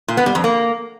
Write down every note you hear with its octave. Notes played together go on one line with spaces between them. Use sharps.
A#2
B3
G3
F2
A#3